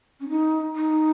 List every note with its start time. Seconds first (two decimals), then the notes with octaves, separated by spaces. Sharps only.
0.20 C#4
0.29 D#4
0.76 D#4